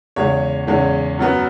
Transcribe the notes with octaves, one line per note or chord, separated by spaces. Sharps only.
E2 C#3 G#3 C#4 C#5
E2 C#3 G#3 C#4
F#2 F#3 B3